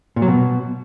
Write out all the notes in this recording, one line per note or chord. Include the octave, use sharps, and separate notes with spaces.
A#2
F#3
B2